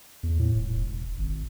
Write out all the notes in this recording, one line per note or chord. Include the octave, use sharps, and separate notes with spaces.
E2
A2
D#1
E1
G#1